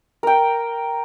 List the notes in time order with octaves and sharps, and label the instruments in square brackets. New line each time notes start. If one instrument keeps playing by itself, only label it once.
[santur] A#4 G5